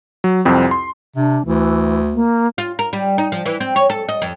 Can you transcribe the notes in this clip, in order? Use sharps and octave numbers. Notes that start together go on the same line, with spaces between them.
F#3
C2 F2 C4
C6
C3 D4
D2 E3
A#3
F4
A#4
G3
D#4
F3
E3
C4
C#5
A4
D#5
F2